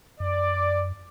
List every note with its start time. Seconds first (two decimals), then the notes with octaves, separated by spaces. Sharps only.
0.20 F#2 D5